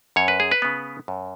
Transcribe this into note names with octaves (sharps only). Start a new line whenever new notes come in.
F#2 C#5
B4
G#4
B4
C#3 B3
F#2